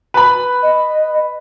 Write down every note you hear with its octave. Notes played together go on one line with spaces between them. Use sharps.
B4 B5
D#5